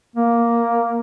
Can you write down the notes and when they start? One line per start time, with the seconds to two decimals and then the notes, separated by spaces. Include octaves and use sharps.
0.16 A#3